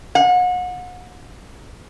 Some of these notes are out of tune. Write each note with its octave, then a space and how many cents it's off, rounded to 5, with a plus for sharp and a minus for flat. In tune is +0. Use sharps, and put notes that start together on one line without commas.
F#5 -35